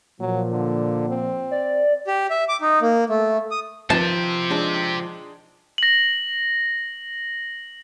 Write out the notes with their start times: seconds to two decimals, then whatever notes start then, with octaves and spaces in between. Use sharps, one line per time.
0.20 A#2 F3 F#3
0.52 D3
1.09 C4
1.51 D5
2.07 G4
2.30 E5
2.49 D6
2.61 D#4
2.82 A#3
3.10 A3
3.51 D#6
3.90 D#3 F3 C4 G4 B4 C5 A5
4.50 G#3 D4 D#4
5.78 A#6 F#7